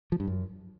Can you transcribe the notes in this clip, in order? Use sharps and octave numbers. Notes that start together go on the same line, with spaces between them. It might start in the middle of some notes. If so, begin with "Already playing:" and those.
F3
G2
F#2